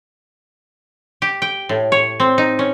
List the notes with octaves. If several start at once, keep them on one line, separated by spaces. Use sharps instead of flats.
G4
G5
A2
C#5
C4
D#4
C#4